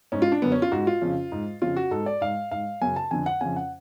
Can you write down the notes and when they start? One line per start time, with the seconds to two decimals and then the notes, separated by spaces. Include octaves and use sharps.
0.12 G#2 C#4
0.22 F4
0.32 D4
0.42 F#2 D3 B3
0.52 C#4
0.62 F4
0.72 G#2 F#4
0.87 F4
1.02 F2 C#3
1.32 G#2
1.62 F2 C#3 F4
1.77 F#4
1.91 G#2 A4
2.06 D5
2.21 G#2 F5
2.51 G#2 F5
2.82 F#2 C#3 G#5
2.96 A5
3.11 F2 D3 G#5
3.26 F#5
3.41 F2 C#3 G#5
3.56 F#5